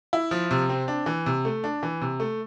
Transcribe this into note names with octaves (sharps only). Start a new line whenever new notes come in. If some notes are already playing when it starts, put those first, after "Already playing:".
E4
F3
C3
C4
D4
E3
C3
A3
D4
E3
C3
A3